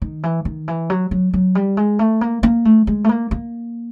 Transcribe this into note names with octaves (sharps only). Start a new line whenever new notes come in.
D#3
E3
D#3
E3
F#3
F#3
F#3
G3
G#3
A3
A#3
A#3
A3
G#3
A3
A#3
A#3